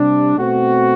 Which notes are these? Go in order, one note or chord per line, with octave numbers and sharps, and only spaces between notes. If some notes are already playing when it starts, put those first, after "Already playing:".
Already playing: C3 G3 D4
B2 A3 C4 F#4